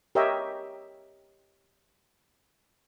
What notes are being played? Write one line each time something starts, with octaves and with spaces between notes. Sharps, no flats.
G4 A#4 C#5 D#5 E5 G5